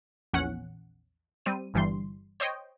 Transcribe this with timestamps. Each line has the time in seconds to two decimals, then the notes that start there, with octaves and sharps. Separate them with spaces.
0.33 A#1 E2 C#4 F#5
1.46 G3 C4 D#7
1.74 G1 G2 E3 G3 C6
2.40 C5 C#5 D#5 G5